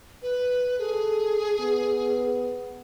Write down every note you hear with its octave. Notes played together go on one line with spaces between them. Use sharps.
B4
G#4 A4
B3